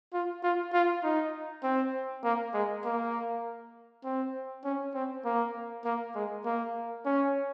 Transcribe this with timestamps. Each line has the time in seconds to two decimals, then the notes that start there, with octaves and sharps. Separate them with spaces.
0.13 F4
0.43 F4
0.73 F4
1.04 D#4
1.64 C4
2.24 A#3
2.54 G#3
2.84 A#3
4.04 C4
4.64 C#4
4.94 C4
5.25 A#3
5.85 A#3
6.15 G#3
6.45 A#3
7.06 C#4